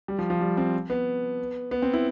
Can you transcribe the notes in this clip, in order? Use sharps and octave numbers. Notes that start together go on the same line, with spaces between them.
G3
F3
F3
G3
C4
B3
B3
C4
E4